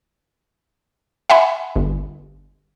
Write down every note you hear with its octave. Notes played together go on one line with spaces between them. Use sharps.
E5 F#5 G#5 B5
G1